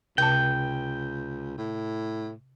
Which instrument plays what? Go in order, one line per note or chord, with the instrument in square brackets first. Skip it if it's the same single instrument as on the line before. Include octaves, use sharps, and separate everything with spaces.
[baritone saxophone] C#2 [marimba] C3 A5 [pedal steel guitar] G5
[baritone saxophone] A2